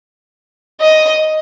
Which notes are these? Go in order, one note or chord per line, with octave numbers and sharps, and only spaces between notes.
D#5